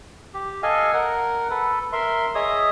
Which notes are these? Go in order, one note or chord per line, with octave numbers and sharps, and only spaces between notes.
G4
A4 D#5 F5 G#5
A#4 F#5
A4 B4
A#4 E5 C6
G#4 C#5 D#5 E5 D#6